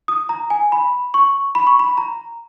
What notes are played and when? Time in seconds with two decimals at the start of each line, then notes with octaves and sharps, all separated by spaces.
0.08 D#6
0.29 A#5
0.50 G#5
0.72 B5
1.14 C#6
1.55 B5
1.67 C#6
1.79 B5
1.97 A#5